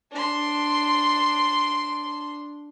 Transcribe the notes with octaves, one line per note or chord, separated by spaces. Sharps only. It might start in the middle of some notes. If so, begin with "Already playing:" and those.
D4 C6